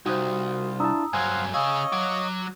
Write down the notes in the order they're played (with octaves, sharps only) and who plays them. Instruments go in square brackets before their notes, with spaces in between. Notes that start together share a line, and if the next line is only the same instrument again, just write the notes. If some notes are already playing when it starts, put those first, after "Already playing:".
[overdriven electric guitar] C2 [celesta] D#4 C5 [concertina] F4 [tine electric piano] F#4 D#6
[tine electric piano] D4 E4 A5 [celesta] A#5 D#6 E6
[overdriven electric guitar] G2 F#3 [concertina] C5 F5 F#5 [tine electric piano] G#5
[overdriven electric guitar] C#3 G#4 [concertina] C#5 D#5 [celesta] F5 E6
[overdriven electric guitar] F#3 F#4 [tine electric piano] D6